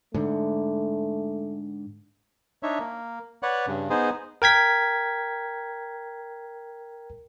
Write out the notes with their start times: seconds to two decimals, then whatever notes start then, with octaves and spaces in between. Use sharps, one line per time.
0.14 G#2 D3 A3
2.63 D4 D#4 C#5 E5
2.79 A#3
3.43 B4 C#5 D5 F#5 F#6
3.67 G2 C#3
3.90 B3 D#4 G#4 C5
4.42 A#4 G5 G#6 B6